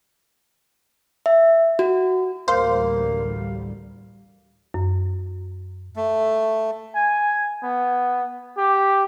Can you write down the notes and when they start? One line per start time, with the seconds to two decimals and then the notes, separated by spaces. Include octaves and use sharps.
1.26 E5
1.79 F#4
2.48 A1 D2 G3 A#3 C5 F5
4.74 F#2
5.96 A3
6.95 G#5
7.63 B3
8.58 G4